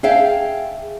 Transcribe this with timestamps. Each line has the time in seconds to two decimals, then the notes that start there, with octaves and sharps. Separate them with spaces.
0.03 G#4 E5 F5 G5 A5